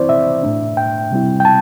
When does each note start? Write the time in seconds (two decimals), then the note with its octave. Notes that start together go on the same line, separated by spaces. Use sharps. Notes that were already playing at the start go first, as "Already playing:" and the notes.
Already playing: E3 C4 E4 C5 D5
0.09 E5
0.43 A2 A3 D4
0.77 G5
1.11 C3 G3 C4 E4
1.40 G5
1.45 A5